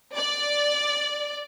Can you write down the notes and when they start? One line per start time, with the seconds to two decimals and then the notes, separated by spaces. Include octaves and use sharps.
0.15 D5